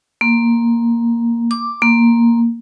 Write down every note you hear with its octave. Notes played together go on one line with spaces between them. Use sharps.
A#3
D6
A#3